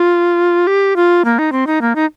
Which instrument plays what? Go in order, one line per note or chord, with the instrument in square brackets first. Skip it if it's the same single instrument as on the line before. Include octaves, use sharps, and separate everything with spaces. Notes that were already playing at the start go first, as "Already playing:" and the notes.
Already playing: [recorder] F4
G4
F4
A#3
D#4
C4
D#4
A#3
D#4